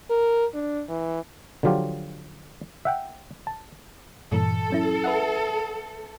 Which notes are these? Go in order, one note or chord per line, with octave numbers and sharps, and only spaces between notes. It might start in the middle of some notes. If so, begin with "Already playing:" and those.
A#4
D4
E3
D3 F3 F#3 F4 G4
E5 F#5 G5
A5
G2 A#2 E3 A4
F#3 C#4 E4
B4 E5 F#5